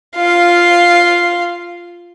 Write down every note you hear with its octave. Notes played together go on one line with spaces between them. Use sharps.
F4 F5